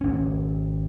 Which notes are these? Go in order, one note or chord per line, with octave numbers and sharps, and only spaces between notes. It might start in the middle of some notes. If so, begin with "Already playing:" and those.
G#1 C#4